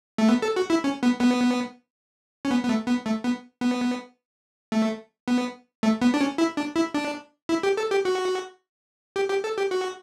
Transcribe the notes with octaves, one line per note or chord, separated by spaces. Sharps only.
A3
B3
A4
F#4
E4
C#4
B3
B3
C#4
B3
B3
A3
B3
A3
B3
B3
A3
B3
A3
B3
D4
C#4
E4
D4
E4
D4
E4
G4
A4
G4
F#4
G4
G4
A4
G4
F#4